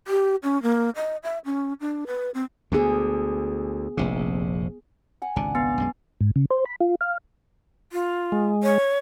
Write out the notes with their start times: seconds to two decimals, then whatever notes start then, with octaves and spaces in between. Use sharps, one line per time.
0.08 G4
0.43 C#4
0.63 A#3
0.96 D#5
1.23 E5
1.45 C#4
1.80 D4
2.07 B4
2.34 C4
2.72 D2 D3 B3 G#4
3.97 F1 A#1 C3
5.22 F#5 G#5
5.36 G#1 C#2 C3 D4
5.55 B3 F5 G#5
5.78 B1 F#2 G#3
6.21 G#2
6.36 C#3
6.51 C5
6.65 B5
6.81 F4
7.01 F5
7.92 F4
8.32 G#3
8.63 C#5